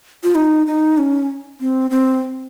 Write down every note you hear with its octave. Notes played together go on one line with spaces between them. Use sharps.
F4
D#4
D#4
C#4
C4
C4